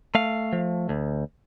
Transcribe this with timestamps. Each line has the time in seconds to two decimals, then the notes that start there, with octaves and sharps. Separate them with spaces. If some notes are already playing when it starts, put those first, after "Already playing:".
0.15 A3 F5
0.53 F3
0.89 D2